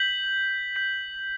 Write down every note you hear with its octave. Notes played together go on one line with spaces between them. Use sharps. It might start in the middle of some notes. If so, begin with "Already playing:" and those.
Already playing: G6 B6 F#7
G6 B6 F#7